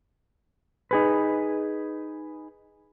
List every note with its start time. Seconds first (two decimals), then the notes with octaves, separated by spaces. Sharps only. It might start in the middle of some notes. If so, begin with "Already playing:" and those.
0.91 D#4 G#4 B4